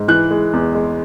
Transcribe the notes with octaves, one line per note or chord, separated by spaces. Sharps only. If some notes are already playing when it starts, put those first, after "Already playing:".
Already playing: G#2
E3 F#6
G#3
E2
G#3